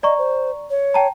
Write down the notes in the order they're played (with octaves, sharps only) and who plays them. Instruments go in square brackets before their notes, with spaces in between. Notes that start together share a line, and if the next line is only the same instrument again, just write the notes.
[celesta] D5 A#5 C#6 [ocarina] D#5
[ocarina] C5
C#5
[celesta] G5 A5 A#5